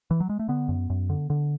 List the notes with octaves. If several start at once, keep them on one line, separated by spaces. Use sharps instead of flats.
E3
F#3
G#3
A3
D3 B3
F#2
F#2
D3
D3